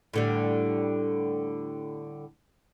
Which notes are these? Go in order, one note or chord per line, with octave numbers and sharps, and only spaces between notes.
A2 D3 G3